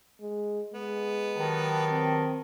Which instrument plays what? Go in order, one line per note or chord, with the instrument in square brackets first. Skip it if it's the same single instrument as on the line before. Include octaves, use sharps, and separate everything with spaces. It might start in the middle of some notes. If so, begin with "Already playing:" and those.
[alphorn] G#3
[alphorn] G#3 [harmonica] B3
[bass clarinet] D#3 [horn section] F#3 G4 A5
[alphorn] C4